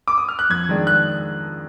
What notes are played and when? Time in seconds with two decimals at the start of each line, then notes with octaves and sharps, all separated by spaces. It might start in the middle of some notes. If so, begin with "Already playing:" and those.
0.08 D6
0.18 D#6
0.28 F6
0.39 F#6
0.50 F2 G#6
0.69 D#3 G#3 D4
0.87 F#6